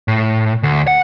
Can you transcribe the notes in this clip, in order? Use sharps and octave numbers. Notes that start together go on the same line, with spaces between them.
A2
D2
F#5